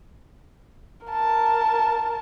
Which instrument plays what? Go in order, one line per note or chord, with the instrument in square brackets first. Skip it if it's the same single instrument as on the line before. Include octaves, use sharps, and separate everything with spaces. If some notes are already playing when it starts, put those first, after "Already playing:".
[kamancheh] A#4 A5